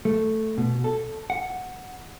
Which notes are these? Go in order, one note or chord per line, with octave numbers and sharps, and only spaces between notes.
A3
B2
A4
F#5